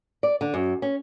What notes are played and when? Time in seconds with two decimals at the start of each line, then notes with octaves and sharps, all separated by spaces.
0.23 D5
0.41 D3
0.54 F#2
0.82 C#4